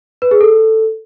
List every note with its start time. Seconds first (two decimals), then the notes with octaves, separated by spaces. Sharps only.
0.22 B4
0.31 G#4
0.41 A4